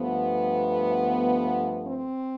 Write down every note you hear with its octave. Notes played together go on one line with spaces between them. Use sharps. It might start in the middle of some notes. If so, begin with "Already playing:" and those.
Already playing: G2 F3 A3 B3
C4